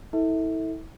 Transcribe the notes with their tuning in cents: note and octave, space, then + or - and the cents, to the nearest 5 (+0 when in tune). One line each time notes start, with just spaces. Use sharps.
E4 -40 A4 +15 E5 -30